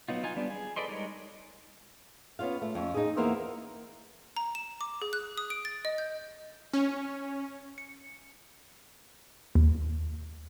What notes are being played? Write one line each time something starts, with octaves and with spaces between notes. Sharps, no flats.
F#3 B3 D#4 F4
D#4 F4 G#5
G3 B3 D4
G#4
A4 B4 D5 D#5 C6
G3 G#3 D#4 A#4 C#5
B3 C#4 F4 F5
A3
F2 C#4
D#4 G#4
E2 A#3 B3 A#4 C5 E5
A#5
E7
D6
G#4
F#6
D#6
D7
A6
D#5
G6
C#4
C#7
D#2